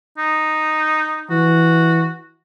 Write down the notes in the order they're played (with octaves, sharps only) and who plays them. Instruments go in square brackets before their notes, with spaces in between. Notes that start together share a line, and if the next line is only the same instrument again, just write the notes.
[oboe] D#4
[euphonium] E3 [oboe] F#4